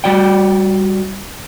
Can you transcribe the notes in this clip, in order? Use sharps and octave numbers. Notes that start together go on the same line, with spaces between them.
G3 F#4 D5 G5